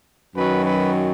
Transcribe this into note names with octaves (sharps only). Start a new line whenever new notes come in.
F#2 D#3 F#3 B4
B4